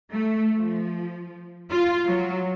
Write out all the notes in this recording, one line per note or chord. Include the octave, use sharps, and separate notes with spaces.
A3
F3
F4
F#3